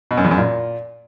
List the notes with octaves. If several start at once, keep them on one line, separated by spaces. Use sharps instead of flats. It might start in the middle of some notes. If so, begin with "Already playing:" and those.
B2
F#2
E2
F#2
A#2